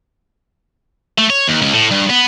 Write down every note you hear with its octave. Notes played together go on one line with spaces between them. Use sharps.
A3
C#5
D#2
C#2
A2
G2
B3